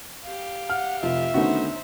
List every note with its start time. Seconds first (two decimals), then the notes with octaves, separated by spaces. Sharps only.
0.24 G4 F5
0.70 F#5 F6
1.03 F1 F4 E5
1.34 D3 D#3 A3 B3 C#4 D#4 F#4 C5